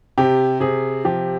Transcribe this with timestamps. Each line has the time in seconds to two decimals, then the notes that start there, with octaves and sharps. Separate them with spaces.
0.18 C3 G4
0.60 C3 G#4
1.04 F3 G4